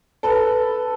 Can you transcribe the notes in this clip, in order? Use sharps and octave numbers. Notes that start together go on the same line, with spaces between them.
A4 B4